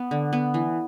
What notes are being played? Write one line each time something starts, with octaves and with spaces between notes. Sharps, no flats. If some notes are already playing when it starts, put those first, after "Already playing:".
Already playing: B3
D3
B3
E3